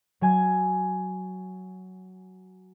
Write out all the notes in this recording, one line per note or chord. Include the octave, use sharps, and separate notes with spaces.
F#3 G#5 G#6